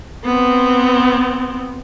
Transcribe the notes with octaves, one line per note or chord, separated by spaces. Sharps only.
B3 C4